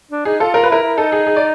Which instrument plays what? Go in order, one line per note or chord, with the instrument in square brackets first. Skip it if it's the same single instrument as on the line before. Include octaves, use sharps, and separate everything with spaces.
[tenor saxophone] D4
[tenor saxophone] D#4 [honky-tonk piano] G#4
[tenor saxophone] F4 [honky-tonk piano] A4
[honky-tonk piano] A#4
B4
[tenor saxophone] E4 [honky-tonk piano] A#4
[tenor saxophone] E4
[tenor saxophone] D#4 [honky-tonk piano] A4
[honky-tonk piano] G#4
G#4
D5